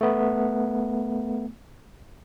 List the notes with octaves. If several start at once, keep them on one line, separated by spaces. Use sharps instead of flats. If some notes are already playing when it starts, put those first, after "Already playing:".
A3 B3